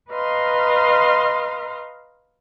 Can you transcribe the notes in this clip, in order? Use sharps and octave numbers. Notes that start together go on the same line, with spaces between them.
B4 D#5 F5 A#5 C6